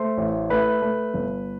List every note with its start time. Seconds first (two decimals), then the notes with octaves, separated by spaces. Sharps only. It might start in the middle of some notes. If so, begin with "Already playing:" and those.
Already playing: A3 C5 C6
0.17 A1
0.50 A3 B4 B5
0.82 A3
1.14 G1